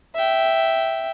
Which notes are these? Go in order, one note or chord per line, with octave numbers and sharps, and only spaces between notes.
E5 G5